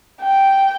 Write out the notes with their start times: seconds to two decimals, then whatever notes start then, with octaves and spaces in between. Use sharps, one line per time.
0.21 G5